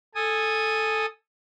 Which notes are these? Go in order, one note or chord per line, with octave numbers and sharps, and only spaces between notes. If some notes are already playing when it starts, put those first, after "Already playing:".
A4 G#5 D#6